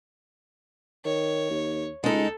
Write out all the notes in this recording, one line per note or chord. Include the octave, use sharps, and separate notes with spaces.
D#3 C#5
D#2
C#2 G#3 D#4 A4